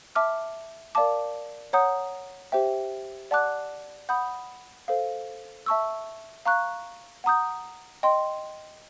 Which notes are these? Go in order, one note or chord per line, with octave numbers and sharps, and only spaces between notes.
E5 A5 D6 F6
A#4 D5 F5 A5 D6
C#5 F#5 A#5 D#6 G6
G4 C5 E5 G5
D5 F#5 A5 D6 F#6
F#5 B5 D#6 G6
A4 C5 F5
E5 A5 C#6 E6
F5 A#5 C#6 F#6
F#5 A#5 D#6 G6
D#5 G5 C6